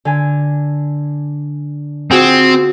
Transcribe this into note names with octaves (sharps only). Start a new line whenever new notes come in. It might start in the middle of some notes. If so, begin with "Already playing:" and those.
D3 G#5
C4 F4 F#4 G#4